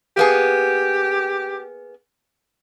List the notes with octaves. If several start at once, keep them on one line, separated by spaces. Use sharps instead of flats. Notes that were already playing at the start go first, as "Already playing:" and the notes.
A#3 B3 G4 G#4